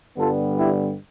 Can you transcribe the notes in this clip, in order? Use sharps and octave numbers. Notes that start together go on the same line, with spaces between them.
G2 D3 G3 B3 F4 A4
E4 G4